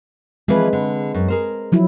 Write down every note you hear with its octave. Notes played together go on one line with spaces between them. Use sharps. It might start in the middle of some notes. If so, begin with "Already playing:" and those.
E3 F3 G#3 C4 G#4 B4
D3
F#2
G#4 A#4 C5
F3 F#3 E4